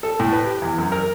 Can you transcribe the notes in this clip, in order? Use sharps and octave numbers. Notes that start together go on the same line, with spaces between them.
A4
A2
B4
G4
E2
F#2
A#4